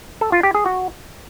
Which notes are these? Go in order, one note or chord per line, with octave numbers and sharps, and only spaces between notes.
A4
F4
G4
G#4
F#4